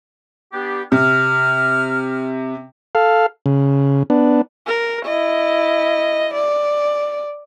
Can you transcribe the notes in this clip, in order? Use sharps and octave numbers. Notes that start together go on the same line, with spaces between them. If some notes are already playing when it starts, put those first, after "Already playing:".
B3 D4 G4
C3 F6
A4 F5
C#3
B3 D4
A#4
E4 D#5
D5